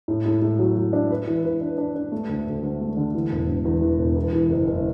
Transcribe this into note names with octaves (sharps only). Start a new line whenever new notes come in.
A2
A2
A2
F#3
F#3
D4
B4
E3
B4
D4
D4
D4
A3
D2
D2
D2
A3
D3
E3
E1
E1
E2
E3
E1
E2
E3
F#1
F#1